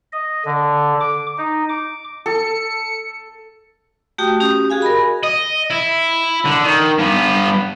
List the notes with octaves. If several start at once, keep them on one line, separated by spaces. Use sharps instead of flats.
D#5
D3
D6
D#4
D6
A4 C#7
A3 F#4 G4 G5 D#6
C#4 G4 D#6
F#4 G#4 F5 G#5
A#4 D#5 B5
D#5
E4
D3
D#3
G2 B3